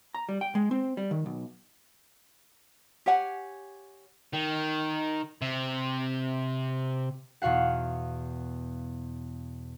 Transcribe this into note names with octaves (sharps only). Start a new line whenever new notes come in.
A#5
G3
G5
G#3
C4
G3
D#3
B1
G4 C#5 F#5 G#5
D#3
C3
E2 B2 F#4 F5 F#5